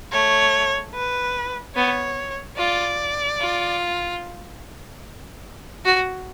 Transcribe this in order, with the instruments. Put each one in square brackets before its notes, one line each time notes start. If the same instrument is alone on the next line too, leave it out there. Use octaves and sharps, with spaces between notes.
[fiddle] A3 [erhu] C#5
[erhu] B4
[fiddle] B3 [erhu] C#5
[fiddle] F4 [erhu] D5
[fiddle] F4
F#4